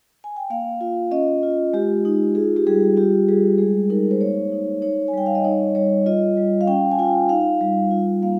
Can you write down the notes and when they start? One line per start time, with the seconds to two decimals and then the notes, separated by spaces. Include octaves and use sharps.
0.24 G#5
0.37 G5
0.50 A#3 F5
0.81 F4
1.11 C#4 D#5
1.43 F4
1.73 G#3 G4
2.05 D#4
2.35 F4 G#4
2.56 G4
2.67 G3 G#4
2.97 F4 G4
3.29 G3 G#4
3.58 G#3 G#4
3.90 D#4 A#4
4.11 C5
4.20 A#3 C#5
4.52 D#4
4.82 D#4 C#5
5.08 G#5
5.13 G3 G5
5.26 F5
5.35 D#5
5.44 D#4 C#5
5.75 G3 C#5
6.06 F4 D#5
6.37 G3
6.61 F5
6.67 C#4 G5
6.91 G#5
6.99 F4 G5
7.29 D#4 F5
7.61 G3
7.91 F4
8.22 A#3 F5